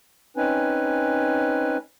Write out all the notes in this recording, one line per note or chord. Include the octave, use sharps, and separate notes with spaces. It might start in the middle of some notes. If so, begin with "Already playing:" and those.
C4 C#4 D#4 B4 G#5